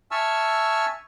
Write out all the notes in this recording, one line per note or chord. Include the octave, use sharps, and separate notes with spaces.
E5 G#5 A5 C#6 E6 F6